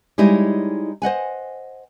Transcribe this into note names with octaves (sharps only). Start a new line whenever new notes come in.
G3 G#3 D#4 E4 C#5 D#5
C5 D#5 F#5 G#5